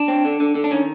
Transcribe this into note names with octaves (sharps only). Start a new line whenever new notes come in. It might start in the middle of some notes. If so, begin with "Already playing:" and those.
Already playing: D4
C4
D3
D3
D3
D4
D#3 C#4